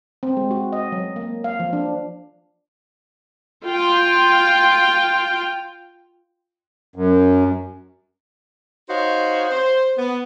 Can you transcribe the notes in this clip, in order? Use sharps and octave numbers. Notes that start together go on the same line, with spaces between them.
C4
G#3
F#4
D#5
F#3
A#3
F5
F3
D4
F4 G5
F#2
D#4 F#4 C5 C#5 F5
C5
B3